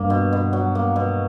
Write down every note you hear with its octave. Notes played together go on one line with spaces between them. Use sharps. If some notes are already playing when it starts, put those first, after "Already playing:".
Already playing: G2 A#3
B2
B2
F#3
A#3
B2